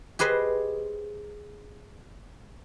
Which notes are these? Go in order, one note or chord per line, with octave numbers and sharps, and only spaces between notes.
G4 G#4 B4 C5 D#5